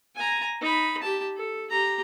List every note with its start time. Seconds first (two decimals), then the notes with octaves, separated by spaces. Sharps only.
0.16 G#5 A#5
0.61 D#4 B5
1.02 G4 A5
1.36 A4
1.70 G4 A#5